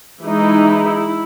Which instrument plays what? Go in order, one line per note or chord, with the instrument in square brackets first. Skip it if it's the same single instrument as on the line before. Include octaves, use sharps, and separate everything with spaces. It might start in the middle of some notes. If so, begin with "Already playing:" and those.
[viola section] E3 G#3 D#4 E4